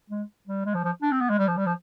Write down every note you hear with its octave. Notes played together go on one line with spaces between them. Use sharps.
G#3
G3
G#3
F3
F3
D4
C4
B3
G#3
G3
F3
G3
F3